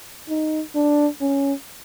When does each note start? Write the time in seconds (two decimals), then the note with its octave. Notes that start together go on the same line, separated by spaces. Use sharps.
0.29 D#4
0.75 D4
1.21 C#4